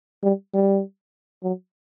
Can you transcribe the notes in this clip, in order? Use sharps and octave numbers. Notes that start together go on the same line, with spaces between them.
G3
G3
F#3